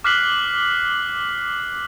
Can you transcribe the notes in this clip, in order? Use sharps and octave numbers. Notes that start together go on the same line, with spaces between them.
D6 F6 F#6 B6 C7 F#7